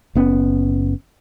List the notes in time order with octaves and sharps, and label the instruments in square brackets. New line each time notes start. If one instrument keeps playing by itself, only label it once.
[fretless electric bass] F#1 B3 C#4